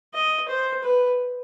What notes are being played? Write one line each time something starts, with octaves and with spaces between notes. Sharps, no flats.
D#5
C5
B4